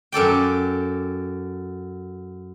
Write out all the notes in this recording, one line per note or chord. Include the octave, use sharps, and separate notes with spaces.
F#2 A4 D5 G5